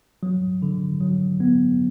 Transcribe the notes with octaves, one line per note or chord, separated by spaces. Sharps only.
F#3
D3
F#3
B3